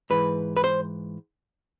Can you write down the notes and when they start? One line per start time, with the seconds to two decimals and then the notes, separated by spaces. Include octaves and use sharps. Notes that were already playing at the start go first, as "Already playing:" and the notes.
0.10 G#2 E3 B4
0.57 B4
0.64 C5